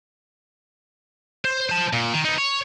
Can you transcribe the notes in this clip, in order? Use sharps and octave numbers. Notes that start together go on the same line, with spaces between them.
C5
C5 A5
A#2
D#3
B3 D#4
C#5